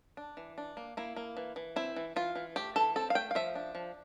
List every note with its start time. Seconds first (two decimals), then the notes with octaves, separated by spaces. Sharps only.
0.17 D4
0.37 E3
0.58 D4
0.77 A#3
0.97 A#3 E4
1.16 A#3
1.37 E3
1.56 E3
1.76 C4 E4
1.96 E3
2.16 E3 F4
2.35 E3
2.56 A3 G4
2.76 E3 A4
2.96 C4 A4
3.10 F5
3.15 A3 G5
3.31 F5
3.35 F3 E5
3.55 D4
3.75 F3